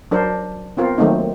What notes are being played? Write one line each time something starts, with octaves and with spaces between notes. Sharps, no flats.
F#3 D4 A#4 C5
B3 C4 F4 A#4
D#3 F#3 A3 A#3 C4 D#4